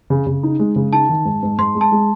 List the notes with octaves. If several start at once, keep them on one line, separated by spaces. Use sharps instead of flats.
C#3
C#3
D#4
G#3
C#3
D#4 A5
D#3
G#2
G#2
G#2 C6
G#3
A5
G#3